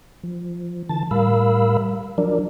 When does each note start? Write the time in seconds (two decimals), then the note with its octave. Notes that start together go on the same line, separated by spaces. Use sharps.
0.23 F3
0.89 D3 E3 A5 A6
1.11 A2 G3 A#4 F5 B5 E6
2.18 F3 F#3 D4 A#4 D5